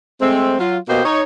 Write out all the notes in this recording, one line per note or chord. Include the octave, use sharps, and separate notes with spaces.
G#3 A3 C4
F#3 F4
B2 A#3 G4 C5 D#5
D#4 C#5